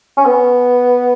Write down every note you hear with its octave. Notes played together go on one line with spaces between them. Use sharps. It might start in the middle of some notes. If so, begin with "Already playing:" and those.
C#4
B3